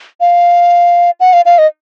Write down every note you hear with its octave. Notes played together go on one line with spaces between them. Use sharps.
F5
F#5
F5
F5
D#5